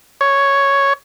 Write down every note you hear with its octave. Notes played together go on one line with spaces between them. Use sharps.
C#5